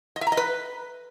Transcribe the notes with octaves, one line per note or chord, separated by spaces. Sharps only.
D#5
E5
A#5
D#5
B4